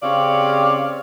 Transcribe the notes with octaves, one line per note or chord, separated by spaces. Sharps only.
C#3 C4 G4 C#5 D5 F5